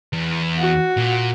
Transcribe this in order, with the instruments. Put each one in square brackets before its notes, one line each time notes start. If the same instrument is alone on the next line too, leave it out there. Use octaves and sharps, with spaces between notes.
[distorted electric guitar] E2
[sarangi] F#4
[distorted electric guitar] A#2